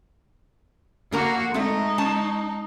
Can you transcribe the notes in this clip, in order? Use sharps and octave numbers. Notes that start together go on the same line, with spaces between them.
D3 A#3 F#4 A#4 A#5
G#3 A3 C4 D#4
C#4 A5